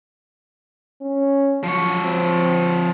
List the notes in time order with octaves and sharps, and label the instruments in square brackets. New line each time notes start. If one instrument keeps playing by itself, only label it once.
[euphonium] C#4
[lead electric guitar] F3 C#5 [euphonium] F#3
[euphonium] C4